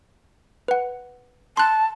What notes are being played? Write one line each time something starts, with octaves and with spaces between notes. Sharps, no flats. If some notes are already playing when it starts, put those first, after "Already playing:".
B4 F#5
A5 C6 F#6